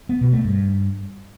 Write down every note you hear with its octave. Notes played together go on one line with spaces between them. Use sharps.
B3
B2
A3
G2